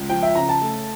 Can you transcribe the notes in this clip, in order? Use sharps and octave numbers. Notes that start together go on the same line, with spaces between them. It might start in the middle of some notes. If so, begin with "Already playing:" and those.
Already playing: C#2
F3 G5
E5
C#3 A#5
A5
A3